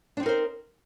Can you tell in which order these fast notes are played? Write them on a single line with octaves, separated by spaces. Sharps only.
D4 C4 D#4 A#4 C5